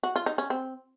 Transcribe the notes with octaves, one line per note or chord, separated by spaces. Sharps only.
F#4
F4
D#4
C#4
C4